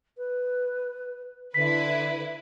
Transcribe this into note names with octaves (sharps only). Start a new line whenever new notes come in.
B4
D3 E4 B4 B6